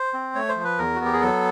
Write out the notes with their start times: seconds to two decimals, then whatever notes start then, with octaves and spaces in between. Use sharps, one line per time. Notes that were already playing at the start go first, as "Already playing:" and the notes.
Already playing: C5
0.13 C4
0.35 A3 C#5
0.49 C5
0.56 F3
0.64 B4
0.79 E2 A#4
0.95 F#4
1.00 B3 G4
1.13 G#4
1.21 F#3 A4